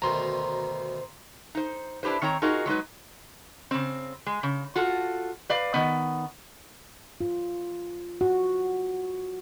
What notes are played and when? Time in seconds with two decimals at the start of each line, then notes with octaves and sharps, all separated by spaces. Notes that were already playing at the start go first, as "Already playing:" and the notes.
0.02 D2 B2 D#3 C5 A#5 C6
1.55 D#4 C5
2.03 D4 E4 G4 B4 C5
2.22 D#3 C4 C#5 A#5
2.42 D#4 F4 F#4 G#4 A#4 D#5
2.66 F#3 G#3 D#4 B4
3.71 C#3 C4
4.26 G#3
4.43 C#3
4.76 F4 F#4 A4
5.49 B4 D5 F5
5.74 D#3 B3
7.21 F4
8.21 F#4